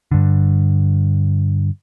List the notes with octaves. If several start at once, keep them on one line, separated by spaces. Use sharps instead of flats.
G2 D3